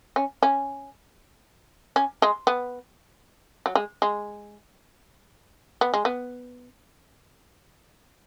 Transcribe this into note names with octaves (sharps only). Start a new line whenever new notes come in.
C#4
C#4
C#4
G#3
B3
F#3
G#3
G#3
B3
G#3
B3